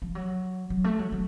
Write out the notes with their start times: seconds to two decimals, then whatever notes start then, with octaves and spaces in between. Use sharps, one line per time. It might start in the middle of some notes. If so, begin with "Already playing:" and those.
0.02 F3
0.15 F#3
0.70 F#3
0.84 A3
0.99 F#3
1.12 F#3